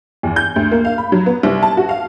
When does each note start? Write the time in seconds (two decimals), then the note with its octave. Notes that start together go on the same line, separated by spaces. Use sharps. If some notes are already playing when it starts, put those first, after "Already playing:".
0.23 E2
0.36 G6
0.56 D2
0.72 A#3
0.85 F5
0.98 B5
1.12 F#3
1.26 B3
1.43 C2
1.63 A5
1.77 F#4
1.89 F5